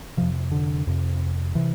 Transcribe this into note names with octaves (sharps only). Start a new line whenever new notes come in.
F2 C3 F3
D3
F2 C3
C3 E3